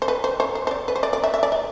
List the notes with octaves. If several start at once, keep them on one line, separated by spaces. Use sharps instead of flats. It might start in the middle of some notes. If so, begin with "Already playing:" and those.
C5
B4
C5
C5
C5
C5
D5
B4
C5
D5
D5
E5
E5
D5
E5